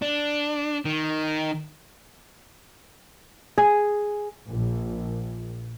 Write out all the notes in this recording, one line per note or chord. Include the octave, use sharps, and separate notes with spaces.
D4
D#3
G#4
A#1